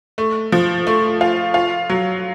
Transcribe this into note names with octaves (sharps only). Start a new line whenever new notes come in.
A3
F3
A3
F4
F4
F#3